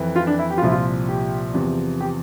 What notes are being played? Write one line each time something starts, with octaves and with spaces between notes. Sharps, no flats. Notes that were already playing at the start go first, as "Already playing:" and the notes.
Already playing: F2 E3
F4
D4
E4
G4
F4
C2 A#2 F3 E4
F4
G4
E2 C3 F3
G4